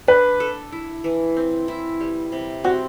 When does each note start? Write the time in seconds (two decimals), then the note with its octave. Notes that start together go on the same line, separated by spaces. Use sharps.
0.08 D4 B4
0.40 A4
0.72 E4
1.04 E3
1.36 C4
1.68 E4
2.00 G3
2.32 C3
2.64 C4 F#4